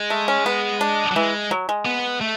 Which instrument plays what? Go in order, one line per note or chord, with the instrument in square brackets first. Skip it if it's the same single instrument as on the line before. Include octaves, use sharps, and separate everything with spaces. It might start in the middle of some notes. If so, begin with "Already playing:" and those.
Already playing: [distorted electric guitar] G#3
[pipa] A3
C#4
B3
D4
[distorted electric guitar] F#3
[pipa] E3 [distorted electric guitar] G#3
[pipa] F#3
G#3
[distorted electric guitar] B3
A3